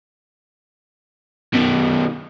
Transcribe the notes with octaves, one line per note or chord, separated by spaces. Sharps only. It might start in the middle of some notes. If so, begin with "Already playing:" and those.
B2 D#3